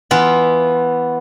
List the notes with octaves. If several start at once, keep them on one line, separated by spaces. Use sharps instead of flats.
E3 B3 F4